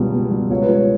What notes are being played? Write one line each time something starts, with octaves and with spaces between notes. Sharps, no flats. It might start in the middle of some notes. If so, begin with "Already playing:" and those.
Already playing: C#2 B2 G3
B2
G3
C#2 C#5
B4
C#2 C#5